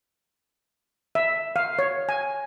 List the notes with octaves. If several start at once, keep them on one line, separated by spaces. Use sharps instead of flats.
E5
F5
C#5
G#5